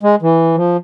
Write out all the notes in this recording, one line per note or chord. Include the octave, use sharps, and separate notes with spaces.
G#3
E3
F3